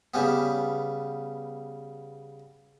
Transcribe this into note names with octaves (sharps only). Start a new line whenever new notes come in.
C#3 G3 B3